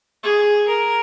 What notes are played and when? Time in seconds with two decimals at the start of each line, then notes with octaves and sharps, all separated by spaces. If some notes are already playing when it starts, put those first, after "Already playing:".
0.23 G#4
0.67 A#4